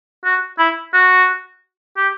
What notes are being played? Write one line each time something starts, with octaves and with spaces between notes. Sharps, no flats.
F#4
E4
F#4
G4